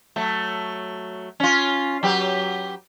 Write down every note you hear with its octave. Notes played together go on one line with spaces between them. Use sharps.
F#3 A3
C#4 F4
F#3 G4 B4